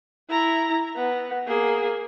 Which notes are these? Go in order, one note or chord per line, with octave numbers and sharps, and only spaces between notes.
E4 A#5
B3
A#3 G#4